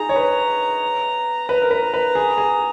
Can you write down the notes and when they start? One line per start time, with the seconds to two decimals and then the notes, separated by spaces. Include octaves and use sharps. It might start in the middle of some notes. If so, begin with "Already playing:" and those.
Already playing: D#4 G#4 A#5
0.09 C#5
0.16 B4
1.48 B4 A#5
1.62 A#4
1.71 B4
1.94 B4
2.15 G#4
2.38 G#4